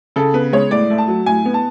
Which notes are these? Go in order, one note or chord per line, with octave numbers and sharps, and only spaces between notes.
C#3 A4
B3 B4
G#3 C#5
A2 D5
A3
A5
F#3
A2 G#5
B3
A5